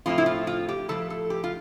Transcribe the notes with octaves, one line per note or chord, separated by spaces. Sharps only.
A2 F3 C4 E4 F4
E4
F4
F4
G4
A2 F3 C4 E4 A4
A4
G4
F4